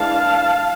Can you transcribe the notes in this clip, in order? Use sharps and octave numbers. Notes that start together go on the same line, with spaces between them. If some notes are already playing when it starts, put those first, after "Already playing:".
Already playing: E3 G#3 D4 F5 A5